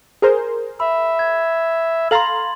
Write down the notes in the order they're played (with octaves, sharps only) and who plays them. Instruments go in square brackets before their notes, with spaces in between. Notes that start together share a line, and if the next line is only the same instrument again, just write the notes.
[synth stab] G#4 A#4 C5
[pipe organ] E5 [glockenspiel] B5
[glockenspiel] G#6
[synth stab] A4 F5 A#5 [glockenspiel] C6 A6 F#7